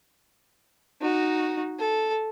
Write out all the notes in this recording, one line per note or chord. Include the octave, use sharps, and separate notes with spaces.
D#4 F#4
A4